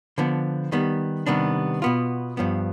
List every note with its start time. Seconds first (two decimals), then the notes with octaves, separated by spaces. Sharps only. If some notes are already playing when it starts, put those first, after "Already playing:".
0.18 D3 F3 B3
0.72 D#3 G3 B3
1.26 C3 D#3 G3 B3 D4
1.82 B2 B3 F4
2.37 G2 F3 B3